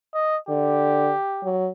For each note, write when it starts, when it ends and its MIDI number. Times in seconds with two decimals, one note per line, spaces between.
0.14 0.38 75
0.49 1.11 50
0.49 1.56 67
1.44 1.69 54